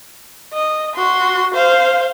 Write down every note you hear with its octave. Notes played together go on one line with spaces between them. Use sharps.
D#5
F#4 C6
C5 F5